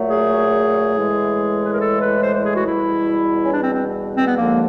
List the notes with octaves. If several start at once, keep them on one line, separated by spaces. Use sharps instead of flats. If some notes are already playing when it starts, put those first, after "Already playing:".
Already playing: A#2 F#3 A3
G#4
A2 E3 G#3
B4
A#4
A4
B4
C5
C5
G#4
F#4
E2 B2 G3 E4
C#4
D4
C4
C4
C4
B3
D#2 D3 F3 G#3 A#3